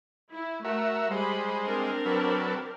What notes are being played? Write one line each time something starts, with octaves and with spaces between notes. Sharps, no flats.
E4
A3 F#4 A#4 E5
G3 G#3 C5 B5
C4 D4 A#4
F#3 A4 B4